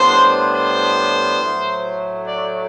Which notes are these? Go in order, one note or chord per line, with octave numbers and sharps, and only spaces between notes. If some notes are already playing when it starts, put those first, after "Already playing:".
Already playing: A2 G3 B3 D4 C5
C5
A2 F#3 A3
D5